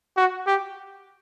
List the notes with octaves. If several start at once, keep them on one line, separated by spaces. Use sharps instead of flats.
F#4
G4